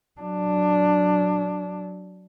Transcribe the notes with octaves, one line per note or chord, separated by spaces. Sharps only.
F#3 D4